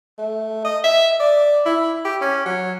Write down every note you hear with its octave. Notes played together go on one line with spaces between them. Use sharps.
A3
D#5
E5
D5
E4
G4
C#4
F#3